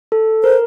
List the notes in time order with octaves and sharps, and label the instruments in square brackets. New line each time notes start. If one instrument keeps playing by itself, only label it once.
[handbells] A4
[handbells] A#4 [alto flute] C5